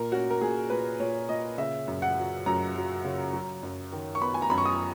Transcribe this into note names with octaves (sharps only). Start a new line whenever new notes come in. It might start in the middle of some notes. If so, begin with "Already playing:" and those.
Already playing: A#2 A#4
C#4 F#4
A#4
A#2 G#4
A#2 B4
A#2 C#5
A#2 D#5
C#3 E5
F#2
F#5
F#3
F#2 A#5
F#3
C#3
F#3
F#2
D#3
C#6
B3 B5
G#5
A#5
F#2 B5
C#6
D#6